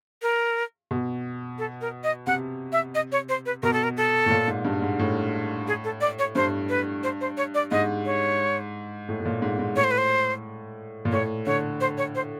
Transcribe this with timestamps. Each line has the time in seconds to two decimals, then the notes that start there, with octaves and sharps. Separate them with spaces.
0.22 A#4
0.91 B2
1.59 A4
1.81 A#4
2.04 D#5
2.27 C3 F#5
2.72 E5
2.95 D#5
3.12 C#5
3.29 C5
3.46 B4
3.63 B2 A#4
3.73 A4
3.84 A#4
3.97 A4
4.26 A2
4.31 A#2
4.48 G#2
4.65 G2
4.82 G#2
4.99 A2
5.68 G#4
5.84 A4
6.01 D5
6.19 C#5
6.35 G2 C5
6.69 B4
7.03 C5
7.21 C5
7.37 C#5
7.55 D5
7.71 G#2 D#5
8.06 C#5
9.09 A2
9.20 A2
9.25 A#2
9.42 G#2
9.59 G#2
9.76 A2 C#5
9.84 C5
9.91 B4
9.98 C5
11.05 A#2
11.12 A2 C#5
11.46 D3 C#5
11.81 C5
11.98 C#5
12.15 C5